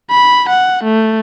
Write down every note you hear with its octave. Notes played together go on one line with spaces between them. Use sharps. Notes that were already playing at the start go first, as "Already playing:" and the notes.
B5
F#5
A3